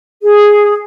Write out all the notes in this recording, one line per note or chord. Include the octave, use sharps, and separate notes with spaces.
G#4